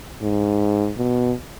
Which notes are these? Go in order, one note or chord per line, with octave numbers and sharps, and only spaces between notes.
G#2
B2